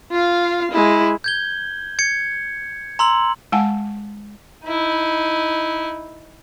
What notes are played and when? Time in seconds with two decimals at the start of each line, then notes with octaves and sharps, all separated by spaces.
0.11 F4 F5
0.71 G#3 E4
1.24 G6 G#6 G7
1.99 G#6 C#7
2.99 A#5 C6 E6 F#7
3.52 G#3 F#5 G#5 A5
4.65 D#4 E4